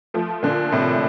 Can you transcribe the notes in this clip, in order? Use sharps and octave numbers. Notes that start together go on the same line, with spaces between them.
F3 A3
A#2 D3
A2 C3